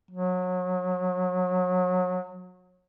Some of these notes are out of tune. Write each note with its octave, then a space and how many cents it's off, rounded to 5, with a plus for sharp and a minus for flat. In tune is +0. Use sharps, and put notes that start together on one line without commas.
F#3 -30